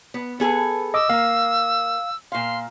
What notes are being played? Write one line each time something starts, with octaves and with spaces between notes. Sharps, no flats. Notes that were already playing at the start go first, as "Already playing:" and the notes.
B3
B3 G#4 A4
D#5 D6 E6
A#3 F5
A#2 F5 C6